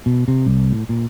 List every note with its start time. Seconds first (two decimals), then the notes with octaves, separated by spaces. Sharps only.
0.06 B2
0.28 C3
0.46 C2
0.72 A2
0.89 A#2